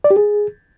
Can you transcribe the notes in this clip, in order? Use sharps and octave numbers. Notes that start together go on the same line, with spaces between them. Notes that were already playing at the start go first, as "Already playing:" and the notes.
D5
G4
G#4